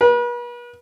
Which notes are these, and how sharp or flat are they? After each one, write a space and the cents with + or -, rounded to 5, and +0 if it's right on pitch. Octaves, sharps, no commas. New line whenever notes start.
B4 -40